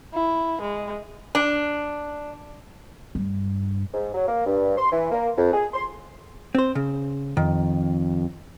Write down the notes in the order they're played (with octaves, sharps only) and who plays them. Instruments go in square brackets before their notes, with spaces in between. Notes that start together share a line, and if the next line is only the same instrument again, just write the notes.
[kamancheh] E4
G#3
[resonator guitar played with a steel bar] D4
[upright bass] G2
[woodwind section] G#2
F#3
A#3
G2
C6
E3
A#3
F2
G#4
C6
[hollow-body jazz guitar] C4 C5
C#3
[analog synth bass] F2 [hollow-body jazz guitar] D#3